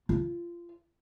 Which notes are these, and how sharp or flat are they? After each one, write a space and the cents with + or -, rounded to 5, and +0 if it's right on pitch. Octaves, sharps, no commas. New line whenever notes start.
F4 -25